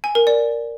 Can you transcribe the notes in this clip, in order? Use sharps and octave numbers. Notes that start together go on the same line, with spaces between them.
G#5
A#4
D5